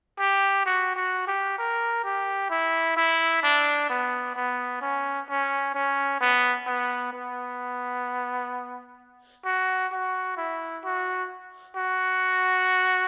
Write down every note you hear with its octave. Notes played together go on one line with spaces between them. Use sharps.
G4
F#4
F#4
G4
A#4
G4
E4
E4
D4
B3
B3
C#4
C#4
C#4
B3
B3
B3
F#4
F#4
E4
F#4
F#4